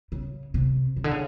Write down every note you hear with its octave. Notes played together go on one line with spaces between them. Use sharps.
C#3
C3
C#3
D3
C#3